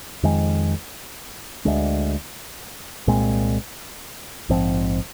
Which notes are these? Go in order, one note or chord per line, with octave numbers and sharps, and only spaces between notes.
F2 D#3 G#3
D2 D3 G#3
C2 A#2 G#3 C4
A#1 G#2 F3 C4